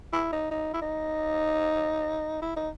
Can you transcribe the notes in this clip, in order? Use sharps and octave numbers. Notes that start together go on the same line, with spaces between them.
E4
D#4
D#4
E4
D#4
E4
D#4